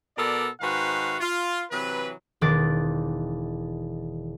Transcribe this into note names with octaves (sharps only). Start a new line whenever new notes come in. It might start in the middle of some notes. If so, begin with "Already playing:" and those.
B2 B3 A4 A#4 D5
G#2 D#3 F#4 B4 C5 F5
F4
C3 E3 F#3 B4
E1 D#3 D6 F#6 A6